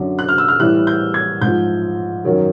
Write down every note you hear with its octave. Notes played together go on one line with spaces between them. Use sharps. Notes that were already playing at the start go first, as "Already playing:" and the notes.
Already playing: F#2 D3 F#3
F#6
F6
E6
F6
A2 E3 G3 F#6
G6
G#6
G#2 F3 G6
F#2 D#3 F#3